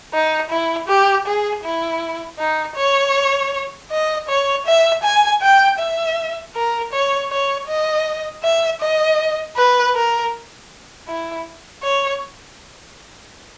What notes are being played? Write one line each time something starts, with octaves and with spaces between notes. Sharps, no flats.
D#4
E4
G4
G#4
E4
D#4
C#5
D#5
C#5
E5
G#5
G5
E5
A#4
C#5
C#5
D#5
E5
D#5
B4
A#4
E4
C#5